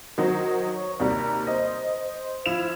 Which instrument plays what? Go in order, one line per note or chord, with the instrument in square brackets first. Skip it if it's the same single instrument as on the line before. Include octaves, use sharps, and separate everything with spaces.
[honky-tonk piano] D#3 F#3 C5
[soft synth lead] C#5
[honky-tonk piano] D#2 C3 G3 [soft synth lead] A#5
[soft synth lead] C5 [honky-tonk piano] D#5
[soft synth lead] C5
[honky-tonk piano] F3 E4 E7 [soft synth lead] F5